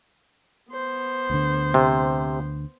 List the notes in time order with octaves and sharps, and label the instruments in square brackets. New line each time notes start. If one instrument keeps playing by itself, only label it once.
[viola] B3 C5
[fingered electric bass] D2 D3
[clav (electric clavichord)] C3